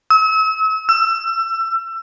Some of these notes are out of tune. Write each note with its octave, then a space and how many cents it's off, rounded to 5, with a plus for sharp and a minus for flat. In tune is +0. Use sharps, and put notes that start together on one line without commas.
E6 -40
E6 +25